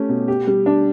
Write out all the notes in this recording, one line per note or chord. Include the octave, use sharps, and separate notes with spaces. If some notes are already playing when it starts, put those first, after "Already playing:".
Already playing: A3 C#4 G4
B2
G4
G3
D4